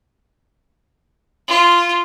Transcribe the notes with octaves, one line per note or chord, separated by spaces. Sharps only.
F4